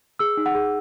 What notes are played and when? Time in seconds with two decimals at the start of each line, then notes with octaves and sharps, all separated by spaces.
0.19 G#4 E6
0.37 D#4
0.46 F#5
0.55 G#4